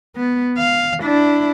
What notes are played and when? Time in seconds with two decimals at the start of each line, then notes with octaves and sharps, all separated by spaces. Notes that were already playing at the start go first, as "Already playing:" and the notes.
0.16 B3
0.58 F5
1.03 D4 E4